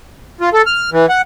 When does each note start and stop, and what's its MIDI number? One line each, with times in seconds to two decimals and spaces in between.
0.41 0.50 65
0.53 0.62 69
0.66 0.90 89
0.92 1.06 52
1.09 1.22 78